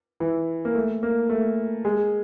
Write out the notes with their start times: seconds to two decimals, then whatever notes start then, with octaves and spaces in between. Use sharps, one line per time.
0.20 E3
0.65 A#3
0.75 A3
1.03 A#3
1.29 A3
1.85 G#3